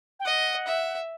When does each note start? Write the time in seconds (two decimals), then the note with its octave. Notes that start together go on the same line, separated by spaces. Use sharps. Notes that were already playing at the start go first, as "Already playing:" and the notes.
0.20 G5
0.25 D#5 F#5
0.67 E5